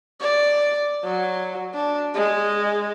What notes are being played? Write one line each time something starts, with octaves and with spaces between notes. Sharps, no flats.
D5
F#3
D4
G#3